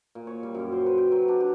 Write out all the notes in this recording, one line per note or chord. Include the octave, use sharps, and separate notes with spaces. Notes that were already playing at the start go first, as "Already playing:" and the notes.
A#2
C#5
G3
F#2
C5
B4
G5
F#3
D4
G4